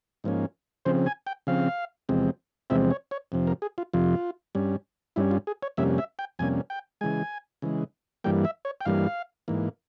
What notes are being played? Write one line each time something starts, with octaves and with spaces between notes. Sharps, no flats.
G#2 F3 A#3 C#4
C#3 F3 C4 C5
G#5
G5
C#3 F3 C4 F5
E2 C3 F3 G#3 C4
E2 C3 F3 G#3 C4 E5
C#5
C#5
F2 C3 F3
A#4
G#4
F4
F2 C3 F3 F4
G2 G3 C#4
G2 G3 C#4 E4
F4
G#4
C#5
F2 C3 G3 A#3 C#4 E5
E5
G5
F2 C3 G3 A#3 C#4 G#5
G5
C#3 E3 G#3 G#5
C#3 E3 G#3
G2 E3 G3 A#3 G5
E5
C#5
G5
G2 E3 G3 A#3 F5
G#2 E3 A#3